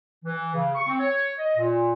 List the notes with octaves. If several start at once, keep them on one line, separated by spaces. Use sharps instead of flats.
E3
C#3
C#6
C4
C#5
D#5
A#2